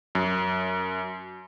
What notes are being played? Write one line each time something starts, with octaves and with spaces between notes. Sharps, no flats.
F#2